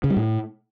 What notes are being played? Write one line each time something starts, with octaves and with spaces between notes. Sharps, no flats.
C#3
G3
A2